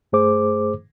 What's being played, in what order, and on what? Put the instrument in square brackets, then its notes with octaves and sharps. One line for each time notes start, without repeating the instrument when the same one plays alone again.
[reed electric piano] G2 A3 G#4 C5 D6